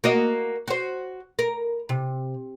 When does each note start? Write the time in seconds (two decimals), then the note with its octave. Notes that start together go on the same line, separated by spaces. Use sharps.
0.04 A#3 F#4 D#5
0.68 F#4 C5
1.39 A#4
1.89 C3